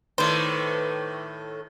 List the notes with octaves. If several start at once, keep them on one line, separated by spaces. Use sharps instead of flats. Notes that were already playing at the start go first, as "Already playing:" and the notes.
A2 D#3 A3 B4 C5 D5